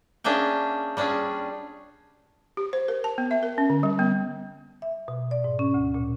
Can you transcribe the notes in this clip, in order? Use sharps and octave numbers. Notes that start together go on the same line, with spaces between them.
A#3 C#4 D4 G#4 E5 G5
G3 C#4 D4 F4 G#4
G4
C5
A#4
A5
B3
E5
A#4
C#4
D3
G3
B3
E5
B2
D5
G#2
C#4
D2
A#2